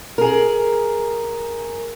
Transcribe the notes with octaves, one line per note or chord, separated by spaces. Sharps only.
G#4 A#4